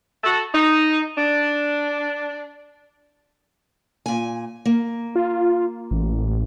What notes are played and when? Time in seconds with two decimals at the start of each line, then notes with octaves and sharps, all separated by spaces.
0.24 F#4 A4
0.54 D#4
1.18 D4
4.06 A#2 G#5
4.65 A#3
5.16 F4
5.91 A1